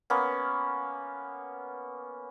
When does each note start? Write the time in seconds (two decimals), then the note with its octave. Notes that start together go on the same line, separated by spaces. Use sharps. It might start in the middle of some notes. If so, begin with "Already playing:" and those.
0.10 A#3 B3 C#4